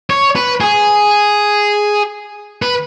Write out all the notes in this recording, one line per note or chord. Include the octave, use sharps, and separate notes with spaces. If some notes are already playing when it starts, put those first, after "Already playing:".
C#5
B4
G#4
B4